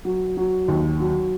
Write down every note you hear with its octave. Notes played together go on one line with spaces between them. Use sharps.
F#3
F#3
D#2
F#3